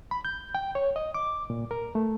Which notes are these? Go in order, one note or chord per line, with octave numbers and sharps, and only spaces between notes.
B5
G6
G5
C#5
D#5
D6
A#2
A#4
A3